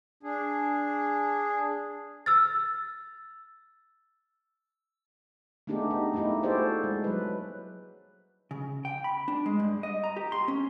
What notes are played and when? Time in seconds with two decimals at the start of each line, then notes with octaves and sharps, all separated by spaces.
0.23 D4 G#4
2.26 E6 F6 A6
5.67 A3 B3 D4 D#4 G4 G#4
5.91 D#4
6.14 A3 A#3 D#4 E4 G4
6.43 A3 F#4 G#4 A4 C5 D5
6.84 G#3
7.04 F#3 B4
8.51 C#3
8.85 G5
9.04 B5
9.28 D4
9.46 G#3
9.59 G2
9.83 D#5
10.04 A#5
10.16 G4
10.32 C6
10.48 C#4